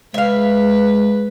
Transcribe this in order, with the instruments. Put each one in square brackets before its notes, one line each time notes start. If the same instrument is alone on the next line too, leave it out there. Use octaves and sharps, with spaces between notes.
[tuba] G#3 [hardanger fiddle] B4 [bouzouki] E5 F5